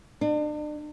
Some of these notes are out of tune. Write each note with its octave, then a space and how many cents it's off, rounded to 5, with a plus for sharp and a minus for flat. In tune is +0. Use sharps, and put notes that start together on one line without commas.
D4 +40